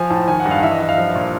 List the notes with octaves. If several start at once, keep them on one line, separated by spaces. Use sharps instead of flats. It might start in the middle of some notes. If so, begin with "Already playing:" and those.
Already playing: F3 G#5
A2 A5
D#3 G#5
F#5
G2
F5
E3 E5
D#5
G2 E5
F5
F3
A#2